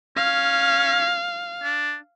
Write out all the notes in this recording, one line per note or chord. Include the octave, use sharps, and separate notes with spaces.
C#4 F5
D4